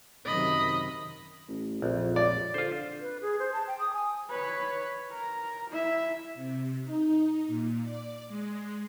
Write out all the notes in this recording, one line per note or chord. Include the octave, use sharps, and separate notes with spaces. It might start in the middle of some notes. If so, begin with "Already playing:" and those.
F#2 C3 D#3 D#5 B5
A1
A#1 F2
D5
D3 F4 C5
B4
G#4
C5
A5
G5
D#6
G#5
B4 C#5
A#4
E4 E5
C3
D#4
A#2
D5
G#3